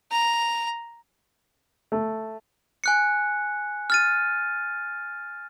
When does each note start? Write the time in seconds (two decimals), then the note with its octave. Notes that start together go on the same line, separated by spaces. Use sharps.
0.11 A#5
1.92 A3
2.84 G#5 F#6 C#7
3.90 F6 A6 D#7